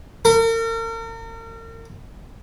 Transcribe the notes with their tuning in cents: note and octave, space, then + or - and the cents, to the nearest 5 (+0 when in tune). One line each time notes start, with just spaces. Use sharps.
A#4 -40